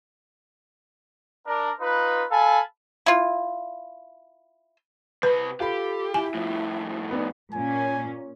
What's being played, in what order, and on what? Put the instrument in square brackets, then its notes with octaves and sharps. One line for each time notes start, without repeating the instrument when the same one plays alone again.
[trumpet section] D4 A#4
D#4 F4 B4
A4 F5 G#5 A5 B5
[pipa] E4 F4
[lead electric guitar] C3 B5 [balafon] B4
[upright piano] F4 B5 [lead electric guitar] G4 [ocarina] A4
[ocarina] E4 [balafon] G#5
[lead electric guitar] F2 A2 [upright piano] F3
[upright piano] B3 D4 D#4
[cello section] A#2 C#4 [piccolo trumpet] G#5